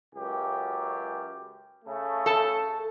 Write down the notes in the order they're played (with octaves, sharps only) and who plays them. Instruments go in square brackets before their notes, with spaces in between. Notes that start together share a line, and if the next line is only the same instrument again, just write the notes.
[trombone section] C#2 F#2 G4
C#3 A3
[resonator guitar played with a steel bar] A4 A5